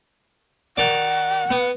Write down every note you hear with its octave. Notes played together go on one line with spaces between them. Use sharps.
D#3 D5 F#5
B3